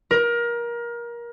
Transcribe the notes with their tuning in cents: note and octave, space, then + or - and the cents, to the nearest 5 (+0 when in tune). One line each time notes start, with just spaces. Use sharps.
A#4 +25